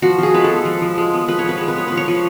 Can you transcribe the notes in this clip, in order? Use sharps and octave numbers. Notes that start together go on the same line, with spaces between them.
F3 F#4
F3 G#4
G#3 B4
B3 A4
F3
F3
G#3
B3
F3 B4
C#5
F3 B4
G#3 C#5
B4
B3 C#5
F3 B4
C#5
F3 B4